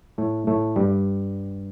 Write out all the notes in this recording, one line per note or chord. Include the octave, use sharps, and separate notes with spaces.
A2 A3
A2 A3
G2 G3